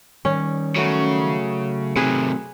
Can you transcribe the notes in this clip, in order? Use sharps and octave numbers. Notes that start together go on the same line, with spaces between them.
D#3 G3 C#4
C#3 F#3 A3 F#4
C3 D#3 C4 G#4 B4